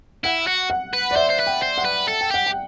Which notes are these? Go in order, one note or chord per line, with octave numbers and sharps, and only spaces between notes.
E4 F#5
F#4
F#5
B4
D5
C5 E5
C5
B4
G5
C5
F#5
B4
A4
G5
G4 F#5
G5